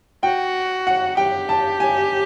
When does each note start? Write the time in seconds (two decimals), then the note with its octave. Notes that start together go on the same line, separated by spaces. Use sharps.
0.23 F#4 G5
0.87 F#5
1.17 G4 G5
1.49 A5
1.80 G#5